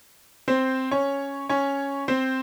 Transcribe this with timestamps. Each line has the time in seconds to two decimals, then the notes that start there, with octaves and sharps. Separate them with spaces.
0.48 C4 C5
0.91 C#4 C#5
1.49 C#4 C#5
2.08 C4 C5